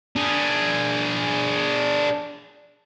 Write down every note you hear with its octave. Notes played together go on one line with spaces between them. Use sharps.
D4 G#4